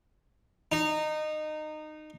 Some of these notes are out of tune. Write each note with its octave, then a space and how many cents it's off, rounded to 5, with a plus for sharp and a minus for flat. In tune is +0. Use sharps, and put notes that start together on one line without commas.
D#4 -20